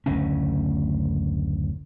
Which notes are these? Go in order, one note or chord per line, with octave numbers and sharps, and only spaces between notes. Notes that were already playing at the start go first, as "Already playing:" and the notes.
F#1 D2 A2 C#4